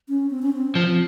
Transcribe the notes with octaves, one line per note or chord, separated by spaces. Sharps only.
C#4
C4
C#4
C4
F3